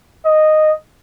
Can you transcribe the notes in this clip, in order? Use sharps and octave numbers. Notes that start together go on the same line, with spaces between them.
D#5